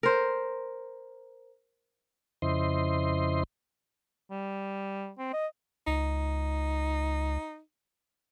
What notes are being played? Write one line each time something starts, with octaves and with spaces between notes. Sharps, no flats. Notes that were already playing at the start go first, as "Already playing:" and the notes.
A#4 C5
F2 C#3 E4 C5 D#5 C6
G3
C4
D#5
C#2 D#4